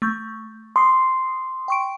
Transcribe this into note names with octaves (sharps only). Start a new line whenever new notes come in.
A3 C#6 G6
C6 D6 D#6 C7
G5 C#6 D7